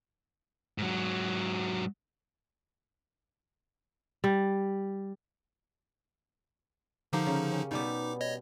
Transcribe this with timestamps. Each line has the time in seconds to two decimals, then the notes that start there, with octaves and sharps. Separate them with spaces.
0.78 G#2 F#3
4.24 G3
7.13 D3 F3 D#4 G4 A#4 F5
7.26 C#3
7.52 C#4
7.71 B2 G3 B3 D#4 D6
8.21 C#5 D#5